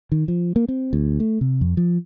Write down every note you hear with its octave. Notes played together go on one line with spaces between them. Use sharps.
D#3
F3
A#3
C4
D2
A3
C3
F2
F3